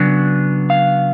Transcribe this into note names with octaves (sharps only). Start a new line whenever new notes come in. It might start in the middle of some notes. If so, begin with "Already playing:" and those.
Already playing: C#3 F#3 B3 D4
F5